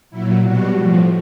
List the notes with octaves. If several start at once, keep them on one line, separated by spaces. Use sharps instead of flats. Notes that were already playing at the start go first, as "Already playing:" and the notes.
A#2 F#3 E4
B2 G3 F#4
A2 F3